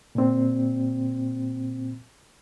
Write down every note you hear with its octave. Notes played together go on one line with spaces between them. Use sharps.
A#2 C4